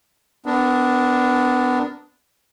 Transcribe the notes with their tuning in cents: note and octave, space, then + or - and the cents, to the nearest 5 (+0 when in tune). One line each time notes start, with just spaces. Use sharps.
B3 +25 D4 +0 A#4 +0